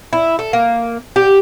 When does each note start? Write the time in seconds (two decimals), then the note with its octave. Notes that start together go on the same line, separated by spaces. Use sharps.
0.13 E4
0.39 A4
0.53 A#3
1.16 G4